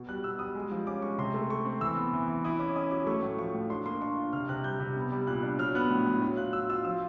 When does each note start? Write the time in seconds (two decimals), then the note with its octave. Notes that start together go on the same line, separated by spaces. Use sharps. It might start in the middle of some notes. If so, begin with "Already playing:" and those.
Already playing: B2
0.09 G3 F#6
0.24 B2 E6
0.39 G3 D#6
0.55 G#3
0.71 F3
0.87 C#4 D6
1.02 G#3 C#6
1.18 C3 C6
1.34 A3
1.49 A3 C#6
1.65 C4
1.81 E3 E6
1.96 B3
2.13 E3
2.28 E3
2.44 E4 D#6
2.59 C#4 D6
2.76 C#4 D#6
2.91 F#3 D6
3.07 A3 C#6
3.23 A2
3.39 F3 C#6
3.55 A2
3.70 D4 C6
3.86 A#3 C6
4.02 D4 C#6
4.18 F4
4.33 C3 F6
4.49 C3 F#6
4.64 G3 G6
4.80 C3
4.96 B3
5.12 G3
5.27 A#2 F#6
5.43 D4
5.59 F#3 F6
5.75 B3 F#6
5.90 A2
6.07 A2
6.22 F#3
6.37 F4 F#6
6.53 F#3 E6
6.69 F4 E6
6.85 F3 E6